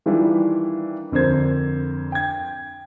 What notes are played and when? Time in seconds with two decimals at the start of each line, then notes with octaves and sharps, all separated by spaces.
0.06 D#3 E3 G3 D4 E4 F4
1.12 F2 D3 A#4 C5 G#6
2.12 G5 G#6